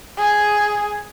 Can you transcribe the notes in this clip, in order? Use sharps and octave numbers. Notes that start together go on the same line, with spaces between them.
G#4